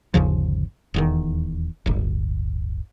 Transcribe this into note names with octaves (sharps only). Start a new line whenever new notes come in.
G1 D#2 C#3 F3
D#1 E2 D#3
D1 G1